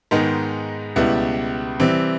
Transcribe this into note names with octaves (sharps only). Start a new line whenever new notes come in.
G#2 D#3 G#3 B3 D#4
C#2 B2 G3 B3 E4
C3 E3 G3 C4